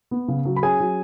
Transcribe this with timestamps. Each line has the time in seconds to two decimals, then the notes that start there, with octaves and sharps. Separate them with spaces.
0.11 B3
0.28 C#3
0.45 F#3
0.56 B5
0.63 C#4 G#4 G#5
0.80 F#3